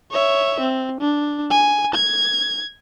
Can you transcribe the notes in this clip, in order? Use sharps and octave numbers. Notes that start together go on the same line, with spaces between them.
C#5 E5
C4
D4
G#5
G#6